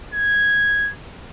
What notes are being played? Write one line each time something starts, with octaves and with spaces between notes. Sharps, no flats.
G#6